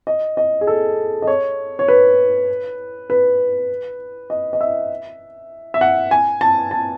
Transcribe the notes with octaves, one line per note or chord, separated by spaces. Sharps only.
D#5
D#5
G#4
A4
D#5
C#5
C#5
B4
B4
D#5
D#5
E5
E5
F#5
G#5
A5
A5